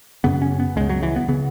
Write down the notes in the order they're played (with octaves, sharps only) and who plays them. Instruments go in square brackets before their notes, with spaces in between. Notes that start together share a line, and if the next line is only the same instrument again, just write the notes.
[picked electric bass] F#2 C#3 B3
C#4
B3
C#2 C#3 G#3
F#3
E3
B3
C#3 B3